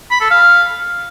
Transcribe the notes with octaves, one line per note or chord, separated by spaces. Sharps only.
B5
A4
F5